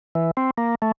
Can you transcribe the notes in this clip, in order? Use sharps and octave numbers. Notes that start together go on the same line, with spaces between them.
E3
C4
A#3
A3